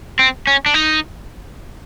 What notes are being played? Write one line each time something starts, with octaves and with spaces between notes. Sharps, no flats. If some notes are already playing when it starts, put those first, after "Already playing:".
C4
C#4
D4
D#4